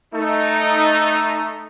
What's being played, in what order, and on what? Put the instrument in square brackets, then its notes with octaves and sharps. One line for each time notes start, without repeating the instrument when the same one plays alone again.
[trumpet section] A3 D#4